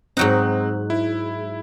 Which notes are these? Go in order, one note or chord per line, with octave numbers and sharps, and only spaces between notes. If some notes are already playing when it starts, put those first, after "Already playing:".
G#2 F#3 C4 D#4 F#6
E4